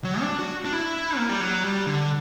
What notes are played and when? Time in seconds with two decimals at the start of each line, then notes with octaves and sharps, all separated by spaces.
0.04 F#3
0.21 D4
0.39 F#4
0.65 D4
0.73 E4
1.17 A#3
1.29 G3
1.41 F#3
1.64 G3
1.86 D3